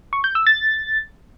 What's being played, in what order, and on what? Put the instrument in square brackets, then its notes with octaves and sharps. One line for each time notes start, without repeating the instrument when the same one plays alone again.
[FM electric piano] C#6
G6
E6
A6